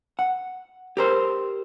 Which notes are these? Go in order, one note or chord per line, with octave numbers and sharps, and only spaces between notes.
F#5
G4 A#4 C5